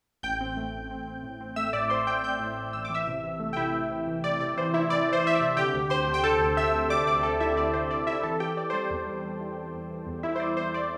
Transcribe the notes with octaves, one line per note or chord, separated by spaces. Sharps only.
A1 G5 G6
C4
A3
A1
C4
C4
A2
C4
A3 E5 E6
A2 D5 D6
A2 C5 C6
C4 G5 G6
C4 G5 G6
A2
A2
A1 E6
D6
E3 E5 E6
C3
C3
A3
G5
C3 E4 E5
E3
C3
E3
C3 D5
C3 D5
E3 C5
E3 E4 E5
E3 D5
E3
C5
E3 E5
D5
C3
D3 G4 G5
D2
D2 C5 C6
D3
G5
D3 A4 A5
D2
C4 E5 E6
D2
D2 D5 D6
D2 D5 D6
C4 A4 A5
D3 E4 E5
D2 D5
C4 C5
D3 D5
C4 E4 E5
E3 A4 A5
E3 G4 G5
E3 D5
C5
G3 D5
E2
G3
G3
E3
G3
E2
E3
E2
G3 E4 E5
C5
E2 D5
E2 C5
D5